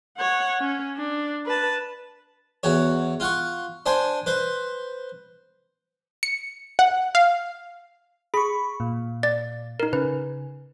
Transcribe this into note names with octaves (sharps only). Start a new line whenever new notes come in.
C#5 F#5
C#4
D4
B4 A5
E2 F#4 C#5
F4 F#5 C#6
D4 C5 G#5
B4 C5
C#7
F#5
F5
G#4 B5 C#6
A#2
D5 A6
D#4 A#4
C#3 B4